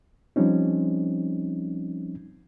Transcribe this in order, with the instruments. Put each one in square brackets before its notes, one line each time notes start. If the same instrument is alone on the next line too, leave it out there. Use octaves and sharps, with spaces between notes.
[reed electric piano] F3 G3 C4 C#4 D#4